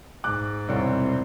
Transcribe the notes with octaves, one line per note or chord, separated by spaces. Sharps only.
G#2 D6 F#6
E1 C2 G3 C4 C#5 D5